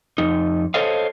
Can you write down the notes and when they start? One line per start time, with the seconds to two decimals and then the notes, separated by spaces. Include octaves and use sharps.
0.18 F2 D#4
0.74 A4 C5 C#5 D#5 F5